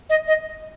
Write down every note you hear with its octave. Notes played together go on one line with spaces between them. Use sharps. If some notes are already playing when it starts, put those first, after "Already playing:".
D#5
D#5